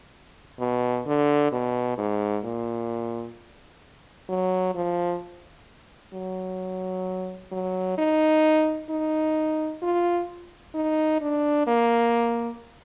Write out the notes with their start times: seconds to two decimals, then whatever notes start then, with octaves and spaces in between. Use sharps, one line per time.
0.60 B2
1.06 D3
1.52 B2
1.98 G#2
2.44 A#2
4.29 F#3
4.75 F3
6.14 F#3
7.52 F#3
7.98 D#4
8.90 D#4
9.82 F4
10.74 D#4
11.21 D4
11.67 A#3